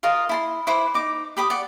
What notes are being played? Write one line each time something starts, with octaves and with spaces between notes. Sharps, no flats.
F4 A#4 D#5 F5
E4 A5 C6
E4 B4 C5 D6
D#4 D6
G4 B5 D6 D#6
D5 F#5